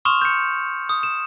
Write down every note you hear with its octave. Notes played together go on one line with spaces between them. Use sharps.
C6 C#6 D#6 F6 E7 F7
G6 C#7
D#6
E7